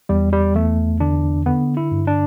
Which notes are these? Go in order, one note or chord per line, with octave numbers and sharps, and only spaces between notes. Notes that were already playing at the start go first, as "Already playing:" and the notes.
E2 G3
G3
E2 A3
D3 D4
D3 B3
E4
G2
D4